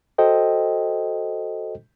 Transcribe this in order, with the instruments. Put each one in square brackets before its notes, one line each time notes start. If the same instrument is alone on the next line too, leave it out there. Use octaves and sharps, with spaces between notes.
[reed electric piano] F#4 A4 C5 D#5 G5